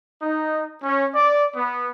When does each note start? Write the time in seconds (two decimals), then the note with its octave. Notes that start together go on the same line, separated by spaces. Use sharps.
0.22 D#4
0.82 C#4
1.14 D5
1.55 B3